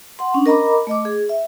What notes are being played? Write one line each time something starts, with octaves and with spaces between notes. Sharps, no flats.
F#5 C6
C#4 D4
A#4 D#5 A#5 B5 D6
A3 D#5 D6
G#4
E5